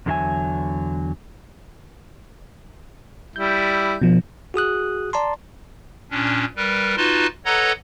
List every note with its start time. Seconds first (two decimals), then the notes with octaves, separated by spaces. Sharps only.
0.06 E2 D3 F#3 F4 E5 G#5
3.36 G3 E4 G6
4.02 B2 F3
4.54 F#4 G#4 D#6 F#6
5.13 D5 A5 A#5 C6
6.11 A#2 C#4 D4
6.56 G3 A#4 B4
6.97 D#4 F4 F#4 B4 A5 C6
7.45 A4 B4 C#5 D#5 F#5 A#5